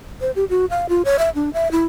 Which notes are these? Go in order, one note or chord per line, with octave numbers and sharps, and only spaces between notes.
C5
G4
F#4
F5
F4
C#5
E5
D4
E5
E4